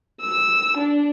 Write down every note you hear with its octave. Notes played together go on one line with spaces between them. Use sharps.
E6
D4